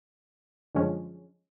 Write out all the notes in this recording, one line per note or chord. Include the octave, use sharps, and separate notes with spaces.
F#2 D3 F3 G#3 C#4